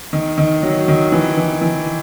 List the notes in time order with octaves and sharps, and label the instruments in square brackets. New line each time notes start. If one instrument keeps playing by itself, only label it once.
[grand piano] D#3
D#3
F#3
D#3
E3
E3
E3